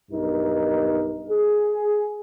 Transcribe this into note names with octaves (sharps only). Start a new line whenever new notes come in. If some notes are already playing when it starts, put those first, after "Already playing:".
B1 G2 D#4 A#4
G#4